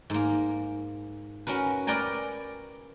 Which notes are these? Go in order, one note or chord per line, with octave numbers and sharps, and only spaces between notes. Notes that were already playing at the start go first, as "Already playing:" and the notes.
G#2 A#3
C#4 F#4 A#4 B4
A#4 B4 D5 G5 G#5 A#5